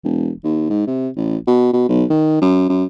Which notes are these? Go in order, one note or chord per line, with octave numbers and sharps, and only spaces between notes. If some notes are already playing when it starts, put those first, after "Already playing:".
E1
D#2
G#2
C3
A1
B2
B2
B1
D#3
F#2
F#2